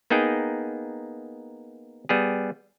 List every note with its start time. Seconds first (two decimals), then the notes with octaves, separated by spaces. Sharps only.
0.10 A#3 B3 D#4 G#4 G5
2.09 G3 B3 G#4